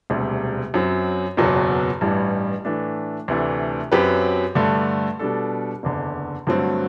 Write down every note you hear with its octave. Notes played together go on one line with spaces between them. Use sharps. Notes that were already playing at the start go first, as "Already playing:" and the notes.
E1 D2 C3 G3
F#2 F#3 C4
F#1 E2 B2 F#3
A1 G2 E3 G3
A2 E3 A3 D4
D2 C3 E3 A3 D4
F#2 F#3 C4 G4 B4
G2 D3 A3
B2 G3 D4 A4
F#1 E2 D3
G2 D3 F#3 A3 C4